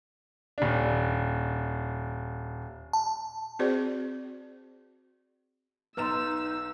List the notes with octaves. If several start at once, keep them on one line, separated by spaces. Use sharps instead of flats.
D#1 D4
A5
C4 F#4 G#4 C5 D5
B1 D#4 B4 D#5 A#5 C6 E6 E7